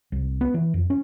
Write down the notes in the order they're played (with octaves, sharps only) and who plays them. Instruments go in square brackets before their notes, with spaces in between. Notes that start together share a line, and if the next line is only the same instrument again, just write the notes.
[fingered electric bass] C2
B3
E3
F2
C#4